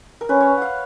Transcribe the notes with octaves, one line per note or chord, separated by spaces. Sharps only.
A#4
C#4 B4
C#5
F5 F#5